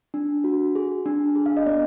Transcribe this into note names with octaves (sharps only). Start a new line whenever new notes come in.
D4
F#4
G#4
D4
G#4
F5
D#5
B3 D5